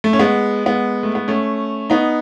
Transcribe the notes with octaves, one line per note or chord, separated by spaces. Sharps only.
A3
C#4
G#3 B3
G#3 B3
A3
B3
A3 C#4
B3 D#4